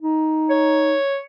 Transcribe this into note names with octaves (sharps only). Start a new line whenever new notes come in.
D#4
C#5